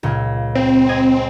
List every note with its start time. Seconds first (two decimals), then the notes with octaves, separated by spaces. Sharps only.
0.03 C#2 A#2
0.55 C4
0.89 D#5 G#5